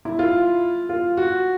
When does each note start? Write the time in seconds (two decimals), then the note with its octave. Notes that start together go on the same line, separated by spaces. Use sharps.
0.05 E4
0.19 F4
0.89 F4
1.17 F#4